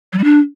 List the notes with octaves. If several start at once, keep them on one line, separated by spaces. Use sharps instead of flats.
F#3
G3
D4